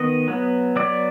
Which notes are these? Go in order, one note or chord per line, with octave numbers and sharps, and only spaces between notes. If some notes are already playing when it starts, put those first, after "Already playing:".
Already playing: D#3 B3 D#5
F#3 B3
F#3 B3 D5